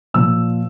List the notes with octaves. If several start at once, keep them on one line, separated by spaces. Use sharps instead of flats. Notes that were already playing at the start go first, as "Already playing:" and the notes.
A#2 F3 E6